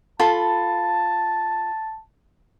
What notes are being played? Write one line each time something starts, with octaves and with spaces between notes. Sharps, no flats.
F4 A4 A5 B5